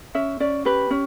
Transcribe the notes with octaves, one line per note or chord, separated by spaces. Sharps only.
C#4 E5
C#4 D5
G4 B4
C#4